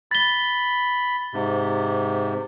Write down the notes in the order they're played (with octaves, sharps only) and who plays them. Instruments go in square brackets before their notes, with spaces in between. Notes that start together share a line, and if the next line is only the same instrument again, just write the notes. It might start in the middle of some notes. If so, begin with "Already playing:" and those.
[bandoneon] B5 [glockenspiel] A6 G7
[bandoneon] G#2 C3